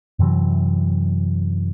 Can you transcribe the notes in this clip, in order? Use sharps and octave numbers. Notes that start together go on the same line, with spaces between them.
F#2 C3 E3 F#3